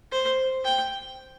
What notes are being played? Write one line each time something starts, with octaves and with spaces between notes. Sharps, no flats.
C5
G5